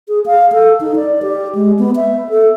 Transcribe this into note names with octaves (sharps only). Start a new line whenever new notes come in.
G#4
F5
A4
D#4
D5
G4
G#3
B3
E5
A4